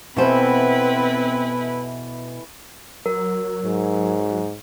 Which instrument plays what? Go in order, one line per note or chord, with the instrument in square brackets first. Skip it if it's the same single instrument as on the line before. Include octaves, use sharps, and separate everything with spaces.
[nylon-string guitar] B2 C5 [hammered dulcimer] E3 B3 A4 [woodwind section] C4 [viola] E4 B4
[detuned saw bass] F#3 [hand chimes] A#4
[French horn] G#2